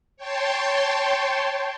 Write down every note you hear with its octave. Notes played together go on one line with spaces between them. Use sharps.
C#5 G5 A5 C6